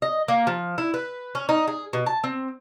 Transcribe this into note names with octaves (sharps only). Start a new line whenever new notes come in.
D#5
A#3
F3
E4
B4
C#4
D#4
G#4
B2
A5
C4